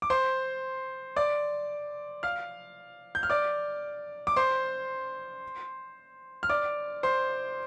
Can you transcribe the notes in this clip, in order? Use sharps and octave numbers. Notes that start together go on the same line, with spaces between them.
D6
C5 C6
D5 D6
F5 F6
G6
F6
D5 D6
D6
C5 C6
F6
D5 D6
C5 C6